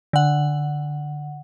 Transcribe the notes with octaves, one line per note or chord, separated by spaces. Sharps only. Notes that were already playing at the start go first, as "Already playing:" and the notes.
D3 F#5